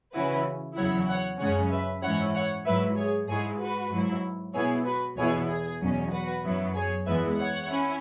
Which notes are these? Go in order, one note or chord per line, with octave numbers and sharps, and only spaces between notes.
C#3 E3 C#4 E4 F#4 B4
E2 C#3 F#3 E4 C#5 F#5
C#5 F#5
F#2 C#3 G#3 C#4 C#5 F#5
B4 E5
G#2 E3 C#4 E4 C#5 F#5
C#5 F#5
G#2 F#3 E4 B4 E5
G#4 C#5
G#2 G#3 E4 G#4 C#5
F#4 B4
G#2 F#3 E4
B2 B3 E4 G#4 C#5
F#4 B4
E2 B2 B3 E4 G#4 C#5
G#4
E2 B2 F#3 C#4
F#4 B4
F#2 F#3 B3 E4
G#4 C#5
E2 E3 G#3 B3 E4 B4 E5
C#5 F#5
C#4 E4